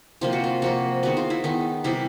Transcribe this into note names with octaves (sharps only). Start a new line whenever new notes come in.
C3 F3 A#3 F4
F#4
F4
C3 F3 A#3 F#4
D#3 G#3 B3 F#4
F4
E4
D#3 G#3 B3 D#4
C3 E3 G3 E4